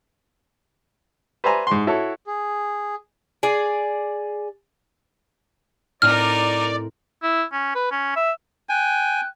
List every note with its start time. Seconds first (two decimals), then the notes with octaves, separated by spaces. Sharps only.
1.44 B4 C5 D5 E5 G#5 A#5
1.67 G#2 C6
1.87 E4 F#4 A4 C#5
2.26 G#4
3.43 G#4 D5
6.02 A2 C4 D#4 A#4 D5 F6
7.23 E4
7.53 C#4
7.75 B4
7.91 C#4
8.16 E5
8.69 G5 G#5 F#6